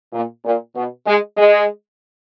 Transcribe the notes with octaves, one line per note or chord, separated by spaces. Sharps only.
A#2
A#2
B2
G#3
G#3